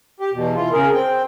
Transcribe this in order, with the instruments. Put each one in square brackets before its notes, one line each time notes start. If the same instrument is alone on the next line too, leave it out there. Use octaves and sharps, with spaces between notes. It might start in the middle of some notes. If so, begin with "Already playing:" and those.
[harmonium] G4
E2 B2
E3 F4
C#3 G#4 A#4
C4 G5